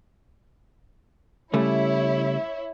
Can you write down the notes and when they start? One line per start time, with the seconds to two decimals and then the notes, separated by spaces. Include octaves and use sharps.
1.53 C#3 G3 A3 E4 C#5 E5